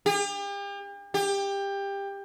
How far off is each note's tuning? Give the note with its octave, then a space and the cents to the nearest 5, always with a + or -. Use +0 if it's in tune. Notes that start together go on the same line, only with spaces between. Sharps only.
G4 +40
G4 +20